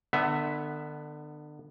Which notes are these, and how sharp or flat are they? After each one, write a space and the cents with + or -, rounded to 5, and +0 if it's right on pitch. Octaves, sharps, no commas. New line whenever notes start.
D3 +35 B3 +0 E5 +0